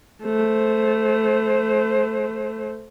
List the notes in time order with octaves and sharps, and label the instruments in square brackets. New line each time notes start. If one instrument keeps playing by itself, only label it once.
[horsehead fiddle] A3 C5